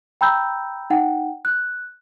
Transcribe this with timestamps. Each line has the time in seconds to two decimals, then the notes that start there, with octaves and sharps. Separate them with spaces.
0.21 G5 A#5 B5 E6 G6
0.90 D#4 F#5 G5
1.45 F#6